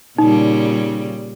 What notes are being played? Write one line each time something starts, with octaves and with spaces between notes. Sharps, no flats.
A#2 C#3 G3 D#4